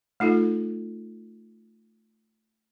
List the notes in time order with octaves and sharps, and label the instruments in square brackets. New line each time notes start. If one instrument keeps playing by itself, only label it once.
[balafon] A3 D#4 F4 A4